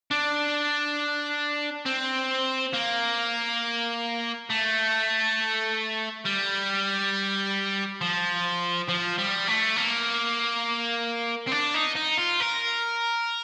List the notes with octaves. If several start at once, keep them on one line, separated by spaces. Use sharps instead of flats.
D4
C4
A#3
A3
G3
F3
F3
G3
A3
A#3
C4
D4
D#4
D#4
F4
A#4